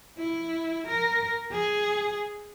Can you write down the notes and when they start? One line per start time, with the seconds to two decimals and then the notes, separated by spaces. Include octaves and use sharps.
0.18 E4
0.87 A#4
1.52 G#4